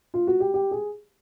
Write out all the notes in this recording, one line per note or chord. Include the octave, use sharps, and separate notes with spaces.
F4
F#4
G4
G4
G#4